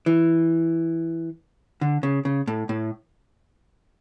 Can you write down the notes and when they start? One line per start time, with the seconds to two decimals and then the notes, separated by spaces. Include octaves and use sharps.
0.06 E3
1.81 D3
2.03 C#3
2.25 C#3
2.47 A2
2.69 A2